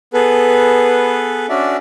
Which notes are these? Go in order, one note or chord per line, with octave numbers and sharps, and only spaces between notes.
B3 G#4 A4 B4
C#4 D4 F#4 D5 E5